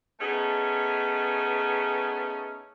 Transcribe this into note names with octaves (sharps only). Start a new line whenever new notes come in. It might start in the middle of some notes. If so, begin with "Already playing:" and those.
A3 B3 C#4 D#4 G#4